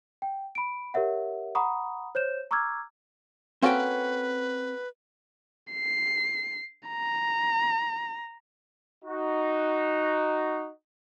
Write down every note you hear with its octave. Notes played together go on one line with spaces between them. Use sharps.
G5
B5 D7
G4 A#4 C#5 E5 F#5
F#5 A#5 B5 C#6 D#6
C5 C#5 G6 E7
A#5 C#6 D6 E6 F6 G#6
A#3 C4 C#4 F#4 A4 B4 G5
C7
A#5
D#4 F#4